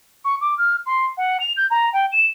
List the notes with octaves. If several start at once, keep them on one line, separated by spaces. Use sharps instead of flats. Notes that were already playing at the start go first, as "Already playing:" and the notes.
C#6
D6
F6
C6
F#5
F7
G6
A#5
G5
E7